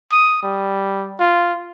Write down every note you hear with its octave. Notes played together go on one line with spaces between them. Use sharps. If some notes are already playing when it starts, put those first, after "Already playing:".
D#6
G3
F4